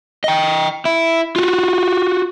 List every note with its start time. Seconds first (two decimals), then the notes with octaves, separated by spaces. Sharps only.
0.24 D#5 G5
0.85 E4
1.36 F4 F#4